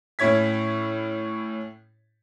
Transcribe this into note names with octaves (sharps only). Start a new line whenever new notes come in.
A2 C#4 E4 C#5 G#6 B6